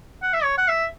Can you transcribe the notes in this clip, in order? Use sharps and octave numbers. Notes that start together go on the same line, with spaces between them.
F#5
E5
C#5
F#5
E5